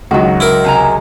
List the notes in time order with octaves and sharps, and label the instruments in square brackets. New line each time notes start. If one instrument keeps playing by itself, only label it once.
[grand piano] C#2 F#3 [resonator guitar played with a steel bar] D#3 F#4
[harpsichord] E4 A#4
[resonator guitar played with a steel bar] C3 G#5 A#5